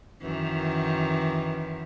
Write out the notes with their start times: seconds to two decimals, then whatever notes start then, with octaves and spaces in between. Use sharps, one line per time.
0.23 F#2 D#3 E3